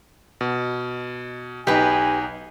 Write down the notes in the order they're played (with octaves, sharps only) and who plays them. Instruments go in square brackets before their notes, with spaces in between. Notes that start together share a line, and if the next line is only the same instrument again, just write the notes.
[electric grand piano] B2
[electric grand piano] B1 D#4 [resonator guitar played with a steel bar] G4 B4 [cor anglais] G#5